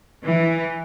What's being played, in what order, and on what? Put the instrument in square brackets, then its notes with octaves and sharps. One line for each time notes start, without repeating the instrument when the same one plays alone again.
[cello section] E3